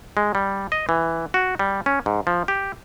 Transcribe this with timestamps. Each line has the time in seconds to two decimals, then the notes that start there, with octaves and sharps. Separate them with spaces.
0.17 G#3
0.35 G3
0.72 D#5
0.89 E3
1.34 F#4
1.59 G3
1.86 C#4
2.06 G#2
2.27 F3
2.48 G4